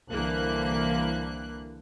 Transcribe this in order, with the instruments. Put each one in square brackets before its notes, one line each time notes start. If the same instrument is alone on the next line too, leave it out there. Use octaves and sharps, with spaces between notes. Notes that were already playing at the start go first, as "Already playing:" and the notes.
[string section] C2 D3 E3 A#3 F#6